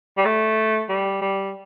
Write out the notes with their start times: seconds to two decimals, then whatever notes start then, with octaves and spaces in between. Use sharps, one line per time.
0.18 G3
0.25 A3
0.89 G3
1.21 G3